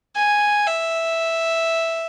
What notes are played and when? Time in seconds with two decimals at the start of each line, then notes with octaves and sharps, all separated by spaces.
0.16 G#5
0.67 E5